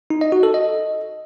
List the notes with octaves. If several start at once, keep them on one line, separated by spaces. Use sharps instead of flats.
D#4
D#5
F#4
A4
D#5